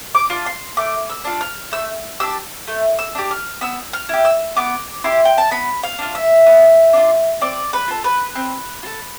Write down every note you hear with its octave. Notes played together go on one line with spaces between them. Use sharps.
D6
D4 F4
C6
A3 D6
E6
D4 F4
F6
A3 E6
D4 G4 E6
A3
E6
D4 G4
F6
B3 E6
F6
E4 G4
E6
B3 D6
E4 G4 C6
G5
A5
B3 B5
F5
D4 F4
E5
B3
D4 F4
C4 D5
B4
F4 A4
B4
C4
F4
A4